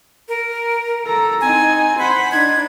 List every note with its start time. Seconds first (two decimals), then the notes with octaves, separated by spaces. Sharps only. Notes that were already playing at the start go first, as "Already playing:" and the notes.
0.28 A#4
1.05 A4 A#5
1.41 C4 D#4 G#5
1.99 C5 F#5 B5
2.32 D4 D#4 G#6